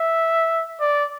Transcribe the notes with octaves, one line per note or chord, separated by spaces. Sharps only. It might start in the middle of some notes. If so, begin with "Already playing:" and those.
Already playing: E5
D5